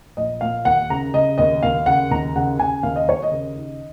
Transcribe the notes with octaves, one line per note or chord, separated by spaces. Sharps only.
A#1 D#5
A#2 F5
D#2 F#5
C#3 A#5
C#3 D#5
D#2 D#5
D#2 F5
C#3 F#5
D#2 A#5
C#3 F#5
C#3 G#5
D#2 F5
D#5
D#2 C#5
D#5
C#3
D#3